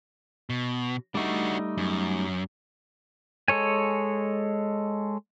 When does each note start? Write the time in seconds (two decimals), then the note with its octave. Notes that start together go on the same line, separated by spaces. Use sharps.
0.50 B2
1.15 G3 A3 D4 D#4 F#4
1.78 F#2
3.48 G#3 A4 C#5 G#5